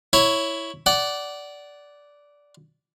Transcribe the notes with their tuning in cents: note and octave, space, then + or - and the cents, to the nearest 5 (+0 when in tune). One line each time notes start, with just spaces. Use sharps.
E4 +0 C#5 +0
D5 -10 F#5 +20